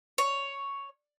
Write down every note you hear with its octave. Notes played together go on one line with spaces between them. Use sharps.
C#5